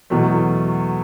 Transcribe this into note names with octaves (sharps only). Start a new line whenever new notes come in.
E2 B2 F#3 A3